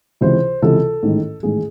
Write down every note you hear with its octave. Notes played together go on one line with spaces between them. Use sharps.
C#2 C3 E3 C5
C#2 C3 E3 A4
A1 G#2 D#3
A1 G#2 D#3 G#4